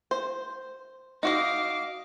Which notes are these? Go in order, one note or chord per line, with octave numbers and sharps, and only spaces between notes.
C5
D#4 F#4 D#5 F5 D6